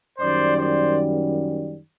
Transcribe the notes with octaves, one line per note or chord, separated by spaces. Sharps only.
F#2 D#3 G3 C5 D5
C5 D5